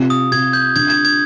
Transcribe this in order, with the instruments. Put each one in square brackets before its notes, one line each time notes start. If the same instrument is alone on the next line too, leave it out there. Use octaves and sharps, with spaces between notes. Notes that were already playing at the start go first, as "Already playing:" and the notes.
Already playing: [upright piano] C3 F4
[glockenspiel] D#6
[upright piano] C3 [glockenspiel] G#6
[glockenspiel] G6
[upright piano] D3 [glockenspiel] G#6
[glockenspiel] G#6
G#6